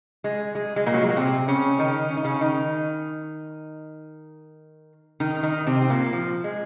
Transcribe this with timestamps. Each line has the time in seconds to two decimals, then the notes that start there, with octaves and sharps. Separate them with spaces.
0.24 G#3
0.55 G#3
0.76 G#3
0.86 A#2 A#3
0.94 F#3
1.02 G#3
1.10 A#3
1.17 C3 C4
1.48 C#3 C#4
1.79 D#3 D#4
2.10 C#4
2.17 D#4
2.25 C#3 C#4
2.41 D#3 D#4
5.20 D#3 D#4
5.43 D#3 D#4
5.67 C3 C4
5.82 C4
5.90 A#2 A#3
6.13 F3
6.44 G#3